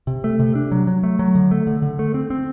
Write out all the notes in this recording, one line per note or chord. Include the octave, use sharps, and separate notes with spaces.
C3
A3
C3
D4
F#3
F#3
A3
F#3
D3
A3
D3
D3
A3
C4
C4